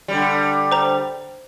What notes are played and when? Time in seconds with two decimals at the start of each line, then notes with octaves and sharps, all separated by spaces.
0.08 D3 G3
0.72 C5 A#5